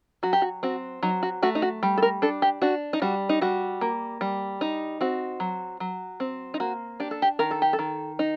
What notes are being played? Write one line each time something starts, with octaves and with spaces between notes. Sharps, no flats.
F#3 F#4
G4
F#4
C4 F#4
F#3 D#4
F#4
A3 F#4
D#4
F#4
G3
A4
A#4
D4 A4
G4
D4 F#4
D#4
G3 F#4
D#4
G3 F#4
A#3
G3
D#4
C4 F#4
F#3
F#3
C4
D#4
A#3 F#4
D4 G4
A4
G4
D#3 A#4
A4
G4
A4
D#3
D#4